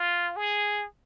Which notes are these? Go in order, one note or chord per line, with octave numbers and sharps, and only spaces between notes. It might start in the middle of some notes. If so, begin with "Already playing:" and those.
Already playing: F4
G#4